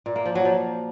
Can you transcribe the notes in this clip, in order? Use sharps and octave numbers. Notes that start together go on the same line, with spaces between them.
A#2
A#3
F3
F#3
F3